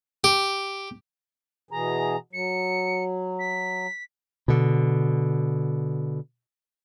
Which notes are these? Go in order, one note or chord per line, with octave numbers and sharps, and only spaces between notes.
G4
B2 E3 G#4 A#5
F#3 C#7
B6
B2 D3